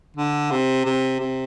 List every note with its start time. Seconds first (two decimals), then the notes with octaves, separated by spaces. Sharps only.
0.17 D3
0.51 C3
0.85 C3
1.20 C3